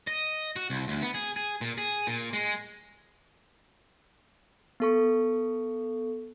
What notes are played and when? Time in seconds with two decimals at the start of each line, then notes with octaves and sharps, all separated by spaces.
0.07 D#5
0.56 F#4
0.70 C2
0.88 D2
1.02 B3
1.14 G#4
1.36 G#4
1.61 A#2
1.78 G#4
2.07 A#2
2.33 G#3
4.80 B3 A4 C#6